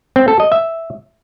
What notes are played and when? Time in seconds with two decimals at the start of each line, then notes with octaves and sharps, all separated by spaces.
0.16 C4
0.28 A4
0.40 D#5
0.52 E5